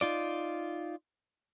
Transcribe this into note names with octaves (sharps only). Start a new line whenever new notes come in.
D#4 F4 D5